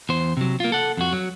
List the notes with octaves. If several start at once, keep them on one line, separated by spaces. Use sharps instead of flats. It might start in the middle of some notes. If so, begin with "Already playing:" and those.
E2 C5
C3 F#3
A#3 F4
A4 F#5
F2 F#4
F#3